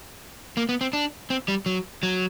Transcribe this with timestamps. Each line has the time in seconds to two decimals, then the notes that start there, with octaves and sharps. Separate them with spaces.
0.57 A#3
0.69 B3
0.81 C4
0.93 D4
1.30 C4
1.48 G3
1.66 F#3
2.03 F#3